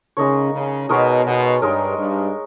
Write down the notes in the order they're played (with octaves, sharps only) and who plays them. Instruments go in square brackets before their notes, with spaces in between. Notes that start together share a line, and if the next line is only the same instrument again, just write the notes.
[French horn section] C#3 [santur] G#3 D#4 A#4 C#5
[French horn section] C#3
[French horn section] B2 [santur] G#3 D#4 A#4 C#5
[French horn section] B2
[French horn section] G2 [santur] G#3 D#4 A#4 C#5
[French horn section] G2